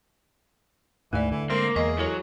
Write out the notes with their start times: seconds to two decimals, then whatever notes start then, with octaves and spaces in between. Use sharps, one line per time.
1.13 D2 G#2 E3 A3 D5
1.31 D3 E3
1.50 G#3 A#3 C4
1.76 E2 E3 G#4 D#5
1.98 F#3 E4 A4 C#5